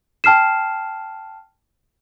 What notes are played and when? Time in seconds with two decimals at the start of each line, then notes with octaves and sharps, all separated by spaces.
0.24 G5 A5 F6 C7 E7